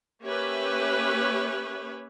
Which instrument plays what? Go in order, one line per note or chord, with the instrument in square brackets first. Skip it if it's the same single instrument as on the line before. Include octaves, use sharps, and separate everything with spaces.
[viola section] A#3 C#4 G4 B4 C#5 E5